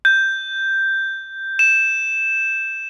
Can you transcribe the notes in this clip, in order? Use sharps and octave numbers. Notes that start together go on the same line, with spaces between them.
G6
E7